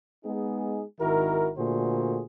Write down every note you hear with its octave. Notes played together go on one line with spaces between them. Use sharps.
G#3 B3 D#4 G#4
G#1 D#3 E4 F#4 A#4
A#2 D3 A3 F#4 G#4 C5